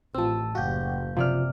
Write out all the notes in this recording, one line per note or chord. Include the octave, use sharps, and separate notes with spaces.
A1 F3 C4 A5 E6
F#1 F#4 G4 F5 G6
C3 F3 D5 F6